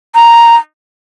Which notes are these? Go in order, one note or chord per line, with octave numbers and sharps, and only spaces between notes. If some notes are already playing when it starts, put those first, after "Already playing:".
A#5